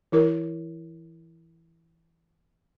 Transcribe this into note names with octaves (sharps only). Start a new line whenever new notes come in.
E3 E4 A#4